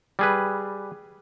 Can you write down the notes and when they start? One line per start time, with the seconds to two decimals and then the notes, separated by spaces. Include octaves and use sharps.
0.19 G3 G#4 B4